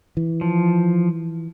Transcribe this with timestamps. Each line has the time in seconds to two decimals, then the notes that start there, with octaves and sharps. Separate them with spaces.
0.17 E3
0.41 F3